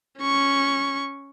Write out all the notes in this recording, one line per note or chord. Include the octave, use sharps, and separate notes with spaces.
C#4 C#6